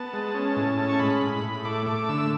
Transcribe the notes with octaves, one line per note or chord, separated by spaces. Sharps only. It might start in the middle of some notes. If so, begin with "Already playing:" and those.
Already playing: B3 A5
G#3
C#4
A2
C#4
C#6
G#3 B5
A2
A2
A3 D6
A3 D6
D3 E6